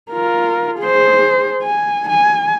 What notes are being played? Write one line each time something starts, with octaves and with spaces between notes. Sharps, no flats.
F4 A#4
G#4 C5
G#5
G#5